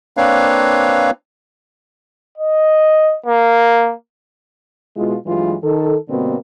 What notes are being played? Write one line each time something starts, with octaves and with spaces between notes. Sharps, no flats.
A#3 C4 D4 B4 C#5 F5
D#5
A#3
B2 G#3 E4 F4
G2 E3 F#3 G#3 F4
D#3 A4
G2 B2 D3 A#3 C4